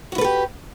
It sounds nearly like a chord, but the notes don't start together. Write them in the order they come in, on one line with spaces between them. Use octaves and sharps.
F#4 E4 B4 A4 G4